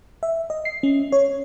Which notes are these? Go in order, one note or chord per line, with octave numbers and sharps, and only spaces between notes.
E5
D#5
C7
C#4
C#5